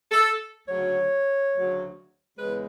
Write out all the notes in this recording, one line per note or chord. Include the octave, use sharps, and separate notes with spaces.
A4
D2 C#3 F#3 C#5
D2 C#3 F#3
E2 C#3 G#3 B4